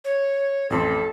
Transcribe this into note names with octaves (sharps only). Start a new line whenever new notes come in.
C#5
A1 F2 A4 C6